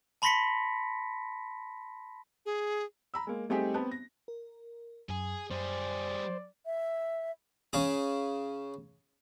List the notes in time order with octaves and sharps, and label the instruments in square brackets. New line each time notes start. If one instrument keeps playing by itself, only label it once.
[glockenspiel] A5 B5 C6 A#6 B6 C#7
[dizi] G#4
[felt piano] A#5 B5 E6
G#3 A#3
G3 A3 C4 D#4 G4 G#4
B3 C4 A5
A#6
[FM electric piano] A#4
[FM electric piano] F#2 [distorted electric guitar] G#4
[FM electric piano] F#2 [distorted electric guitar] G3 G#4 [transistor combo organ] C5 [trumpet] D5
[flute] E5
[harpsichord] C#3 G#4